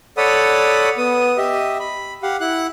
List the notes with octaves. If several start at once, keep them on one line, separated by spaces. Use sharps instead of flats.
A4 C#5 D5 F#5 B5 D#6
B3 D#6
G4 D#5 E5
B5
G4 F5 F#5
E4 F#5 F#6